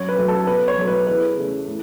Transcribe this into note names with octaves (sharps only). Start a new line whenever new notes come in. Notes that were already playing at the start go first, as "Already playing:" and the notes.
Already playing: F#2 C#5
B4
F#3 A3
A4
B2 B4
C#5
F#3 A3
B4
E2 B4
C#3 A3
A2